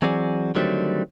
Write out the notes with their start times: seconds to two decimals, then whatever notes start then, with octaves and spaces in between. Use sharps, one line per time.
0.02 E3 F#3 C4 F#4 G#4 D5
0.55 D3 D#3 F#3 G3 A3 C4